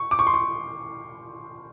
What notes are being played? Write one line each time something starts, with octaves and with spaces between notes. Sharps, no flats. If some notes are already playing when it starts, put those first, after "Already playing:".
Already playing: C#6
D6
C#6
C6
C#6